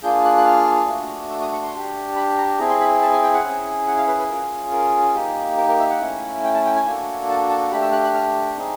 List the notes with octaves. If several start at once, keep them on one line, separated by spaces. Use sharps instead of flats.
A#3 D4 F4 G#4 G6
F#6
F#6
F6
A3 D4 F#4
E6
D#6
C#6
C6
D4 G4
B5
A#5
C4 E4 G#4 A#5
C6
B5
A5
G#5
G5
F#5
C#4 E4 G#4
F#5
F5
B4
B4
C#4 F4 G#4 A#4
A#4
A#3 D#4 G4
A#4
A#4
E5
F#5
A3 C#4 E4
G5
A5
G5
G#5
A#3 D4 F#4 A4
A5
A5
A3 D4 G4 B5
E6
F#6
F#6
F6
C4 D#4 G#4